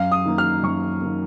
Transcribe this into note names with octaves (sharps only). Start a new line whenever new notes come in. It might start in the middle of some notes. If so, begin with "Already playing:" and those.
Already playing: F#2 F5
D#6
D#3 A#3
F6
F#2 C#6
D#3 A#3